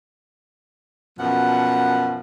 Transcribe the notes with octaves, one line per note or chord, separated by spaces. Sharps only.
F#2 B2 F3 F#5